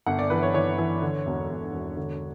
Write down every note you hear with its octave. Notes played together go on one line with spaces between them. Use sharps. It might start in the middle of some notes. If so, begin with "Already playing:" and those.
G1 F#5
D5
E3 B4
C#5
E3 C#5
E3
D3
E1
E1
E1
D3